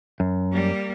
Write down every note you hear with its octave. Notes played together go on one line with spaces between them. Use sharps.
F#2
G3 A#3